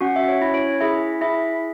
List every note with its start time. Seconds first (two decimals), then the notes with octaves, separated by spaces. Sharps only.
0.01 C#4 F#4 F#5
0.16 E5
0.28 C#5
0.42 E4
0.54 C#5
0.80 E4 G#4 E5
1.21 E4 G#4 E5